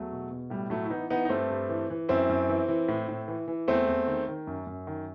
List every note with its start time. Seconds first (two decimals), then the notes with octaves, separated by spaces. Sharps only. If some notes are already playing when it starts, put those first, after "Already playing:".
Already playing: E2 F#3 A3
0.11 B2
0.31 B2
0.50 A2 G3
0.70 A2 F#3 A3
0.85 E4
0.90 E3 B3 D#4
1.10 E3 B3 D#4
1.25 D#4
1.29 G2 A3 C4
1.50 G2
1.69 E3
1.90 E3
2.09 F#2 C4 E4
2.29 F#2
2.49 E3
2.68 E3
2.88 A2
3.08 A2
3.28 E3
3.48 E3
3.68 E2 A3 C4
3.88 E2
4.07 D#3
4.28 D#3
4.47 F#2
4.67 F#2
4.87 D#3